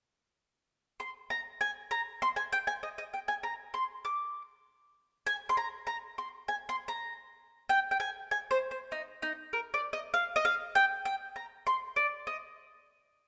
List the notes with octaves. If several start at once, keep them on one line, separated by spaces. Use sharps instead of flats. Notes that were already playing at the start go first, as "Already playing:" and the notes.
C6
A#5
G#5
A#5
C6
G#5
G5
G#5
D#5
D#5
G5
G#5
A#5
C6
D6
G#5
C6
A#5
A#5
C6
G#5
C6
A#5
G5
G5
G#5
G#5
C5
C5
D#4
D#4
A#4
D5
D#5
F5
D#5
F5
G5
G5
A#5
C6
D5
D#5